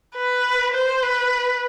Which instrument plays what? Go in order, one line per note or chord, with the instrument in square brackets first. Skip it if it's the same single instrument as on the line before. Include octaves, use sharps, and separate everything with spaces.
[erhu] B4
C5
B4